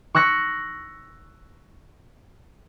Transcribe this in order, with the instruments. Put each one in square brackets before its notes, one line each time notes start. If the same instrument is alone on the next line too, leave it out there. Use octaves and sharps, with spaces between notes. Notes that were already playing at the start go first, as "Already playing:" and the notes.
[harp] C#6 E6 F#6 A#6 C#7